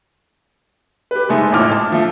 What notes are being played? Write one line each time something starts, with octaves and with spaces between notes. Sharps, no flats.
G4 B4
F#1 G#3 A3 D#4
A1 F2 G#2 A3 D6 F6
A5
D3 F3 A3